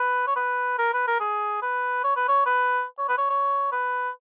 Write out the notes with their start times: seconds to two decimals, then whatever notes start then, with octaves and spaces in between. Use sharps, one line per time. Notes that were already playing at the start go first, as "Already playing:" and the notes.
Already playing: B4
0.27 C#5
0.36 B4
0.78 A#4
0.94 B4
1.07 A#4
1.20 G#4
1.62 B4
2.04 C#5
2.16 B4
2.28 C#5
2.46 B4
2.98 C#5
3.08 B4
3.18 C#5
3.30 C#5
3.72 B4